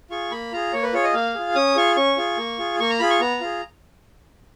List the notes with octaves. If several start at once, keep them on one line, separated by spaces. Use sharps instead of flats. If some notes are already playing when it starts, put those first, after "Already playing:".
F4 G#4 C#6
A#3 B5
F4 G#4 A#5
A#3 C#5
B4
F4 G#4 C#5
D#5
A#3 F5
F4 G#4
C#4 D#6
F4 G#4 C#6
C#4 C#6
F4 G#4
A#3
F4 G#4
A#3 C#6
A#5
F4 G#4 B5
C#6
B3 A#5
F4 G#4